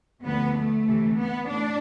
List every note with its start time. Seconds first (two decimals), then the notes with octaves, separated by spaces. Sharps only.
0.24 D2 D3 F3 B3
0.56 A3
0.86 D2 C3 E3
1.17 B3
1.48 A2 D4